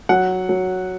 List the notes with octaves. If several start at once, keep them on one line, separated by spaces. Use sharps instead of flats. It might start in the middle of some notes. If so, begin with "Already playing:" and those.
F#3 F#5
F#3